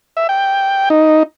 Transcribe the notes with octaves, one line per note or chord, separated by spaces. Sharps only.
E5
G5
D#4